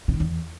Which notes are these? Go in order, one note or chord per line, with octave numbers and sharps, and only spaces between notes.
C3
D#3
E2